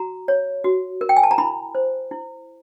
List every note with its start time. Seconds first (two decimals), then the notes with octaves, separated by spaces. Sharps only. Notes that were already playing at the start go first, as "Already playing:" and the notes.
Already playing: F#4 A#5
0.28 C#5
0.64 F#4
1.01 A#4
1.09 G5
1.17 G#5
1.23 A5
1.31 A#5
1.38 E4 B5
1.75 C5
2.11 E4